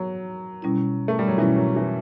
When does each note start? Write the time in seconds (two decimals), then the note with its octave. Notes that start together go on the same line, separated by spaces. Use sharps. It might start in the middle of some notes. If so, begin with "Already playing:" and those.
Already playing: F#3
0.62 B2 G3 C#4 E4
1.08 A3
1.19 G3
1.28 F#3
1.38 B2 E3 G3 C#4 E4
1.56 F#3
1.76 E3